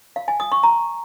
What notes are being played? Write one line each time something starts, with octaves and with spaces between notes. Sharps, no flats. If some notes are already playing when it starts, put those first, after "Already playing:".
F5
G#5
D#6
C#6
A#5